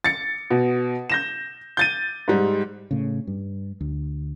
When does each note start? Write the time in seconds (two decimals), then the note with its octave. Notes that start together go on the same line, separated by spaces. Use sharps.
0.04 A6 C#7
0.51 B2
1.10 G6 A#6 E7
1.77 G6 A6 D#7
2.28 G#2 G3
2.91 A2 C#3
3.27 G2
3.81 D2